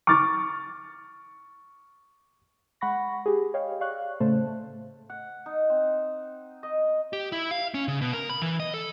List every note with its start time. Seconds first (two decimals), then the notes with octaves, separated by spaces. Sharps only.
0.07 C#6 D6 F6 A6
2.81 G#3 F#5 B5 C#6 A#6
3.26 G4 G#4
3.54 C#5 D#5 F5 G5
3.81 D5 F5 C#6 F#6
4.20 A2 C#3 A3 C5 A5
5.10 F#5
5.46 D#4
5.70 C4
6.63 D#5
7.13 G4
7.32 E4
7.51 F5
7.74 C#4
7.88 C#3
8.01 B2
8.13 A#4
8.30 B5
8.42 E3
8.60 D#5
8.74 A4